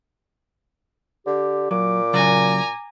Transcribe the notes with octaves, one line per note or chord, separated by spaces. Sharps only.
D3 G4
A#2 F#3 D6
C#3 F#3 D5 G#5 A#5